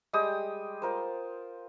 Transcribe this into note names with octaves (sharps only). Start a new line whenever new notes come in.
G3 G#3 G5 D#6
F4 A#4 C5